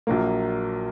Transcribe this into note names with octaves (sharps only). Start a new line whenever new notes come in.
A#1 A#2 F#3 A#3